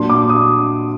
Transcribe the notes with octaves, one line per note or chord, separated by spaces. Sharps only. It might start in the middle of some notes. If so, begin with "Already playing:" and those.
Already playing: A#2 F#3 A#3 D4 C6
D6
D#6